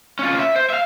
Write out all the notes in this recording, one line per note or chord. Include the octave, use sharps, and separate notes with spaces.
C#4 F4
E5
C5
E5 F5